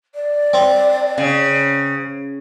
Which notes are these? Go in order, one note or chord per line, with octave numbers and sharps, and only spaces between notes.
D5
C4
C#3